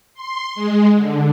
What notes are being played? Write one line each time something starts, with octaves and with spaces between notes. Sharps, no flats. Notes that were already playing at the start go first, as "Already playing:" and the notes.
C6
G#3
D3